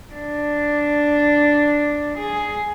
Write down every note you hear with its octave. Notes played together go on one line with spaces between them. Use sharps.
D4
G#4